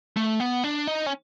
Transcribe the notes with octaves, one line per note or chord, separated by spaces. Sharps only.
A3
B3
D4
D#4
C#4